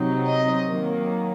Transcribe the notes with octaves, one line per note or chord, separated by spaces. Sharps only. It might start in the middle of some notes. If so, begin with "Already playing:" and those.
Already playing: C3 F#3 C4 D#4
D#5
D#3 F#3 A#3